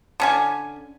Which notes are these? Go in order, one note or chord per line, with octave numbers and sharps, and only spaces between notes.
D3 C#4 G#5